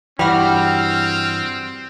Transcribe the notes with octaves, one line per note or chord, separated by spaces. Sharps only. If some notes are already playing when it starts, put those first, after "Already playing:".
G2 E3 G3 C4 F#4 F6